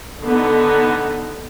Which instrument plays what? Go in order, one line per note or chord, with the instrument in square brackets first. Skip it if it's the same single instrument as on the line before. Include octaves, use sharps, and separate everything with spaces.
[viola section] D3 B3 D#4